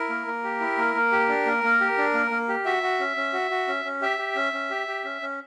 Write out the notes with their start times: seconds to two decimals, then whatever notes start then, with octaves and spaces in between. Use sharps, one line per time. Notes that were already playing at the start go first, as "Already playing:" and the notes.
Already playing: E4 A#4
0.09 A#3
0.27 A#3
0.44 G4
0.60 E4
0.78 A#3
0.95 A#3
1.12 G4
1.28 D4
1.46 A#3
1.63 A#3
1.81 G4
1.98 D4
2.14 A#3
2.31 A#3
2.49 G4
2.65 F#4 E5
2.83 F#4
3.00 C#4
3.17 C#4
3.33 F#4
3.51 F#4
3.68 C#4
3.85 C#4
4.02 G4 E5
4.19 G4
4.36 C#4
4.53 C#4
4.70 G4
4.87 G4
5.04 C#4
5.22 C#4